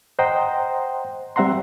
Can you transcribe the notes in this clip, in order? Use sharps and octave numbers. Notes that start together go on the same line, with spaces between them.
C5 D#5 F#5 G5 A#5 C6
G3 C4 E5 F#5 A#5 C6